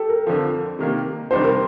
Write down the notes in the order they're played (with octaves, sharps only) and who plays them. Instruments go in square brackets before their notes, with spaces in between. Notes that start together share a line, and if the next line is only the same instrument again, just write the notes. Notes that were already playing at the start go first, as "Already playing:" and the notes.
Already playing: [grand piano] G4 A4
A#4
[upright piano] F2 D3 F3
C3 D#3 A#3
[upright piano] F2 C3 D#3 G3 D4 [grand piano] C5
[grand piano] A#4